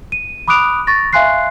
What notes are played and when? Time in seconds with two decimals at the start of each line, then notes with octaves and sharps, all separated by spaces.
0.12 D#7
0.48 B5 D6 D#6 F#6 D7 F7
0.87 C#6 A6 A#6
1.13 E5 F5 G#5 C6 F#6 C7